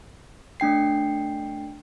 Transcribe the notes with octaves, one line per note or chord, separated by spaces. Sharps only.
A3 D4 G5 C7